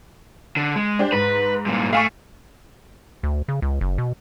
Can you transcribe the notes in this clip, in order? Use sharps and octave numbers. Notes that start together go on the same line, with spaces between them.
D3
G#3
D4 G4 C5
G#2 B4
G2 A#2
A3 F5 G#5 C#6
D2
C#3
C#2
F#1
B2